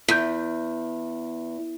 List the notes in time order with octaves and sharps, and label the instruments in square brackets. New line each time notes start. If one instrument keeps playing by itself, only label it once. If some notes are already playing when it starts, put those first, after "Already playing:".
[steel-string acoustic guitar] E2 [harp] G6 B6